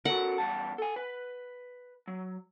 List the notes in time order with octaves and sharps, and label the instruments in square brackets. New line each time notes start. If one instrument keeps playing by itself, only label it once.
[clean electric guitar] F#4 A4 A#4 [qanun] F#5
[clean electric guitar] E2 G3 A5
A4 G#5
B4
F#3